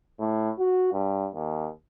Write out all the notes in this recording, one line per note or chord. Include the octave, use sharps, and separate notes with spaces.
A2
F#4
G2
D#2